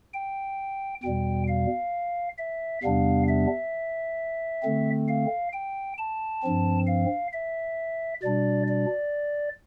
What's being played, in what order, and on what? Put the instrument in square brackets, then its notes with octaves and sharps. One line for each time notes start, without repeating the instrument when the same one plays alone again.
[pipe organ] G5
E2 B2 G3 G5
F5
E5
E2 C3 G3 B3 D4 F5
E5
D3 A3 C4
F5
G5
A5
G2 F3 C4
F5
E5
B2 G3 D4 D5
D5